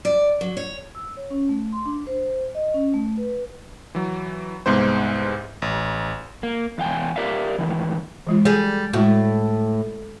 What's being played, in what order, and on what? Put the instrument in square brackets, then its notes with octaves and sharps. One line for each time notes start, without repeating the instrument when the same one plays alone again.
[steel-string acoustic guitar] D5
F#3
C#5
[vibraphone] E6
C#5
C#4
A3
C6
D4
C5
D#5
C#4
A3
B4
[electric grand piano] E3 F#3
C2 G#2 G#3 B3 C5
A1
[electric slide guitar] A#3
E2 F5 G5 G#5
G4 A#4 D5 E5 F5
A2 D#3 E3
[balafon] E3 G#3 F4
[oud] G3 G#4
[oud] A2 [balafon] G#3 E4 F#4